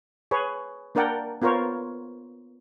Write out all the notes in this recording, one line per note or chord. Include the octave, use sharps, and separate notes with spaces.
G#4 B4 C#5
A#3 D4 A#4 D5 F#5 G5
B3 F4 A#4 C5 C#5